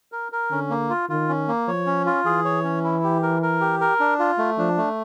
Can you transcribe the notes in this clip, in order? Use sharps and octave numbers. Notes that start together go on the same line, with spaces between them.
A#4
A#4
D3 C#4
A#3
F4
D#3 F4
C#4
A#3
F3 C#5
C#4
F4
E3 G#4
C#5
C#4
E4
G4
A#4
A#4
G4
A#4
D4
F4
A3
F3 D4
A3